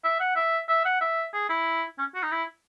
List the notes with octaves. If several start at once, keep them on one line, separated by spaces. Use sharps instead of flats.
E5
F#5
E5
E5
F#5
E5
G#4
E4
C#4
F#4
D#4
E4